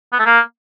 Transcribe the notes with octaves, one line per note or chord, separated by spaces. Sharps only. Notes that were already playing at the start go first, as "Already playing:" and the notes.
B3
A3
A#3